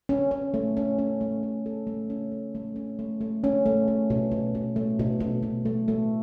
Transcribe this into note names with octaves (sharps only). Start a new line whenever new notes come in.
C#4
C#4
A3
C#4
C#4
A3
A3
A4
A3
C#4
A3
A3
C#4
A3
A3
C#4
A3
A3
B2
B2
B2
A3
B2
B2
B2
A3
A3